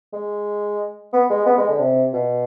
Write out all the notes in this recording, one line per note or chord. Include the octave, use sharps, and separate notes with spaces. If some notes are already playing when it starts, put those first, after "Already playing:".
G#3
B3
G#3
B3
G#3
D3
C3
B2